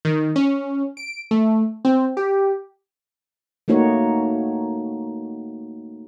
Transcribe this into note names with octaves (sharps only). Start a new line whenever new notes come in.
D#3
C#4
D7
A3
C4
G4
A3 A#3 D#4 F#4 C#5